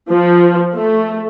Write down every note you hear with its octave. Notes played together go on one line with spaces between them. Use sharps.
F3
A3